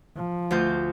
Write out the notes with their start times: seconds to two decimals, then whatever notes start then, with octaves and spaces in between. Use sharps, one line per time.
0.16 F3
0.51 D2 F4 G6